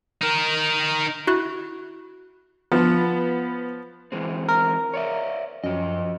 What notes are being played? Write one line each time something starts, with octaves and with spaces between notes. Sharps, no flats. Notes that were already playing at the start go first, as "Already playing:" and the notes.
D#4 A#4
E4 F#4 F#6
F3 B3
E3 G#3 C4
A#4
C#5 D5 E5
F#2 F3 D#5